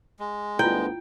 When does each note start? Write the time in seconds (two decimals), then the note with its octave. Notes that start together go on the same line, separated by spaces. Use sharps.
0.19 G#3
0.59 D2 G2 B3 E4 F4 G5